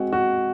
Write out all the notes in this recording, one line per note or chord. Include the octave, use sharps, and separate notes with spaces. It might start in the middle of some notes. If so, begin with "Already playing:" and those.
Already playing: G#3 C4 F#4
F#4